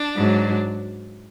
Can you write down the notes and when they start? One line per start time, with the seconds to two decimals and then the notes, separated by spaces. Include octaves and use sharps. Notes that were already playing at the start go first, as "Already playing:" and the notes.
Already playing: D4
0.16 G#2 F#3